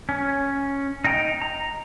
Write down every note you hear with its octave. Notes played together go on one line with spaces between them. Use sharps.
C#4
D#4 D#5 G5 A#5
A#5